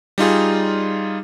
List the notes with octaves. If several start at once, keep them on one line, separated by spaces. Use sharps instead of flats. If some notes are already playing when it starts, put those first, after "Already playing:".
G3 D#4 F4 G#4